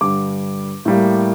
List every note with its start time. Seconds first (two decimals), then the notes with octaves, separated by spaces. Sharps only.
0.01 G2 D3 G3 D6
0.85 A2 G3 A#3